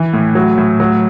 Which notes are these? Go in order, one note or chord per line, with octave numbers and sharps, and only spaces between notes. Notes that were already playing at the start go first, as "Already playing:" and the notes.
Already playing: E3
A2
F#3
A2
F#3